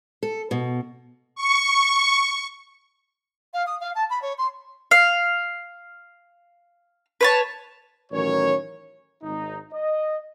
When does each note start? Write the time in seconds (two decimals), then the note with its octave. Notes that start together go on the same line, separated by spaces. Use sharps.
0.23 A4
0.51 B2
1.35 C#6
3.54 F5
3.67 D#6
3.81 F5
3.95 A5
4.10 B5
4.22 C#5
4.38 C6
4.91 F5
7.21 B4 C#5 A5
8.12 A1 D#3 F#3 C#4 A#4 C#5
9.23 G#1 D#4
9.73 D#5